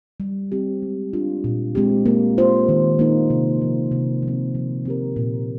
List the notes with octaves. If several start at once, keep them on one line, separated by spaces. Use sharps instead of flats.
G3
C4 G4
G#3
D4 F4
A#2
G#3 C4 G4
A#3
F4 C5
D#3
A#3 D#4
C3
F3 G#3
C3
F3
C4
F3
C4 G4 A#4
A#2